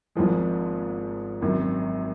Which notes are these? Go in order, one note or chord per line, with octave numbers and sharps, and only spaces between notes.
G#1 G#2 F3 G#3
G#1 F#2 D#3